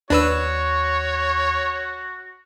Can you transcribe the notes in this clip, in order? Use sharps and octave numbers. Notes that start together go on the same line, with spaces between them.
D#2 D4 F#4 B4 C#5 E6